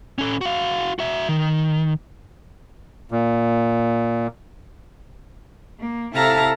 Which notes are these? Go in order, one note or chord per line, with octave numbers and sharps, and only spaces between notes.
C#4 A4
F#4 F5
F#4 E5
D#3
A#2
A#3
C3 E4 A4 F5 A5 A#5